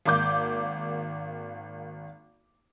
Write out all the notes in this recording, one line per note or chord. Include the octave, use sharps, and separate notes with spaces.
G#1 A#3 D6 G6